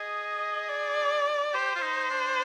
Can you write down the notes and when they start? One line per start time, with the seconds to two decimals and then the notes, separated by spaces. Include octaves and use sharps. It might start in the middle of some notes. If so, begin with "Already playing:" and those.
Already playing: G#4 D#5
0.69 D5
1.54 G4 C5
1.75 F4
1.82 D#4
2.10 D4